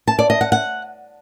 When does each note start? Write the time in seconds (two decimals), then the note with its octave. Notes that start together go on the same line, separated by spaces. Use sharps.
0.08 A5
0.19 D5
0.30 D#5
0.41 F#5
0.52 F#5